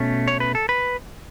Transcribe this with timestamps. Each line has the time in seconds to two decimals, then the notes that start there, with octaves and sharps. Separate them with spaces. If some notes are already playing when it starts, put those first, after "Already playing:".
Already playing: B2 A3 C#4
0.28 C#5
0.40 B4
0.55 A4
0.69 B4